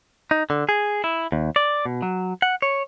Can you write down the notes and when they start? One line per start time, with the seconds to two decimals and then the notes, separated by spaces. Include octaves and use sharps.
0.31 D#4
0.50 D3
0.69 G#4
1.04 E4
1.32 D#2
1.56 D5
1.86 B2
2.02 F#3
2.42 F#5
2.62 C#5